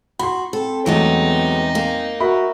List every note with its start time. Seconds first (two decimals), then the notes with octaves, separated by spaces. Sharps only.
0.19 F#4 B5 C6
0.53 C4 A4
0.86 E2 F#3 G#3 A3 B3 D#4
1.75 A#3
2.20 F#4 A#4 E5 B5